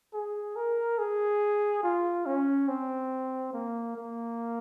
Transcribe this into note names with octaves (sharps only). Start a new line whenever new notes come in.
G#4
A#4
G#4
F4
C#4
C4
A#3
A#3